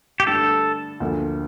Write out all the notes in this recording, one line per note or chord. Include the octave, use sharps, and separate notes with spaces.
G4
G2 D3 A3 A4
D2 D3 F3 A#3